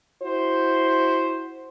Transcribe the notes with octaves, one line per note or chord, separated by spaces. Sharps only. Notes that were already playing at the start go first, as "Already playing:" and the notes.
E4 F#4 C5